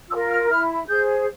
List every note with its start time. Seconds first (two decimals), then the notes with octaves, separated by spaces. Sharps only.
0.09 F4 E6
0.13 A#4
0.29 F6
0.48 E4 F6
0.87 G#4 C5 G6